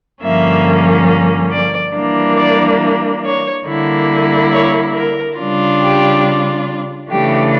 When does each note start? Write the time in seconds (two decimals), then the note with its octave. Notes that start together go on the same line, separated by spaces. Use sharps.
0.23 G2 D3 F3 A#3 C#4 E5
1.53 D5
1.95 E3 G3 A#3 D4
2.38 D5
3.24 C#5
3.67 D3 G3 A#3 E4
4.53 C#5
4.96 A#4
5.39 C#3 G3 D4 F4
5.82 G4
7.11 C#3 E3 A3 D4 G4